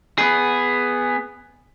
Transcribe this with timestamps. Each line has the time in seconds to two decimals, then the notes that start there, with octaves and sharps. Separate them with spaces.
0.18 B3 G#4